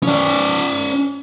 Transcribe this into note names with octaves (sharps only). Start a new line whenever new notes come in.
C#4 D5